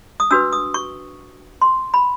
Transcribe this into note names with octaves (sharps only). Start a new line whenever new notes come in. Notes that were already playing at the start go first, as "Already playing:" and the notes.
D#6
D4 F#4 B4 E6
D#6
C#6
C6
B5